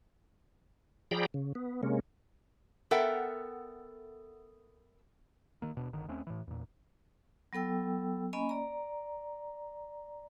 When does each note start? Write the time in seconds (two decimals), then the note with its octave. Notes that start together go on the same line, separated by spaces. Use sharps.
1.11 F3 G#4 D5 G5 A#5 B5
1.34 C#3
1.55 B3
1.83 C3 G#3 A#3 C#4
2.91 B3 A4 A#4 E5 F#5 G5
5.62 D#3 A#3
5.75 D#1 B2 D4
5.93 G1 D3 D#3
6.08 D#2 A3 C4 C#4
6.27 A2 E3
6.47 E2 A#2
7.53 F#3 B3 A4 G5 E6
8.33 A#3 C#4 D#5 G#5 B5
8.49 D5 A#5